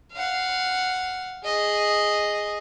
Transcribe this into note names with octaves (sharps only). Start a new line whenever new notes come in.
F5 F#5
G#4 D#5